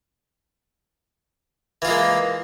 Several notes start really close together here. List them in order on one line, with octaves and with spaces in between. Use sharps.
E3 F4 G#3 A#3